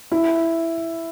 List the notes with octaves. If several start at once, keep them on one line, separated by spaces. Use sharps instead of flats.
E4